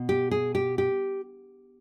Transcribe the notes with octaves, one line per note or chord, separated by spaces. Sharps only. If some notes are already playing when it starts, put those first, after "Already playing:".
Already playing: B2
G4
G#4
G4
G4